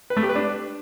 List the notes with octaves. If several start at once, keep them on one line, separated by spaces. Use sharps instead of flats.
B4
A3
G4
B4
D4